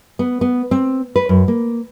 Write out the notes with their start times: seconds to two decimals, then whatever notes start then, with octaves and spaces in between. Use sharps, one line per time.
0.19 B3
0.41 B3
0.71 C4
1.16 B4
1.29 F#2
1.48 A#3